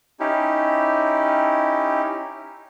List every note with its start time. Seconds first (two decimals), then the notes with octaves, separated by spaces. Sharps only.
0.20 C#4 D#4 E4 G4